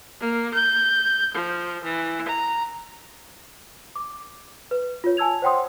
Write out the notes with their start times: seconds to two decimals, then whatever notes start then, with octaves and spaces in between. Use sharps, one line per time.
0.20 A#3
0.53 G6
1.35 F3
1.84 E3
2.28 A#5
3.96 D6
4.71 B4
5.04 F4 C#5
5.17 G#5 A5 E6 G#6 F7
5.42 C5 C#5 F#5 G5 C6 D#6